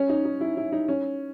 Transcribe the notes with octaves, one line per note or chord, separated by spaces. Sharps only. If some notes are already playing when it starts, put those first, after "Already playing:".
Already playing: C#4
D#4
D#4
E4
E4
D#4
C#4